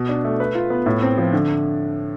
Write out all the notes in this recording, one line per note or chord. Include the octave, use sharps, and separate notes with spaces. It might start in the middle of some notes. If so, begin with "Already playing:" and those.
Already playing: B2
D4
A3
B4
F4
B3
A2
C4
F3
D3